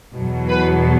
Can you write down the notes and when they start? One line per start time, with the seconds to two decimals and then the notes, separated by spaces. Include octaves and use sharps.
0.13 E2 B2 F#3
0.49 B4